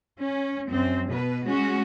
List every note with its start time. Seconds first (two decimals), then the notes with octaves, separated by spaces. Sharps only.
0.19 C#4
0.69 F#2 C4
1.11 B2 B4
1.47 G#3 C#4 F#4